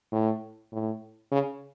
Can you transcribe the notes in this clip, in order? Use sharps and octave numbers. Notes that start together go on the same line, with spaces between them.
A2
A2
C#3